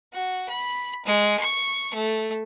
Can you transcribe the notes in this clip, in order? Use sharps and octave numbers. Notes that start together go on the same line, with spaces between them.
F#4
B5
G#3
C#6
A3